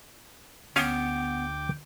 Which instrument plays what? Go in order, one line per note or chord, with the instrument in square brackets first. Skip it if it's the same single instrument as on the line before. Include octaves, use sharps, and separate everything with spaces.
[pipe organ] D2 G5 D6 [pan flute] B3 [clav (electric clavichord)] C#4 F5 G#5